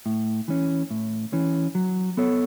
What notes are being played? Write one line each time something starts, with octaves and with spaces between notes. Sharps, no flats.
A2
E3 C#4
A2
E3 C#4
F#3
B3 A4 C#5